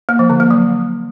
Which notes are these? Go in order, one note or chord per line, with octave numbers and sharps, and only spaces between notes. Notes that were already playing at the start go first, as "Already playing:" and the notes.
A#3
F3
D3
A#3
F#3